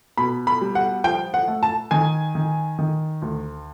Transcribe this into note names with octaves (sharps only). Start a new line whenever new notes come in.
B2 B5
B5
G3
F#5
F3 G5
F#5
A3
A5
D#3 G#5
D#3
D#3
D2